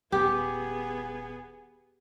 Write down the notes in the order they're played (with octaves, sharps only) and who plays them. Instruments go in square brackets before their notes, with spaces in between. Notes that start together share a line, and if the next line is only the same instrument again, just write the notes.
[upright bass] D#1 [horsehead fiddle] B3 G#4 [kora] G4